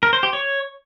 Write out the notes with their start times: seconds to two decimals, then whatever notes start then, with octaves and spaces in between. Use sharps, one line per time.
0.03 A#4
0.13 C5
0.23 G4
0.33 C#5